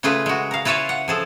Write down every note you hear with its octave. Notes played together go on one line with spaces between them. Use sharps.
C#3 A3 F4 G#4 B4
G#3 F#4
A#4 F5
E4 F4 B4 C#5 E5 F5
F#5
F3 G#4 A4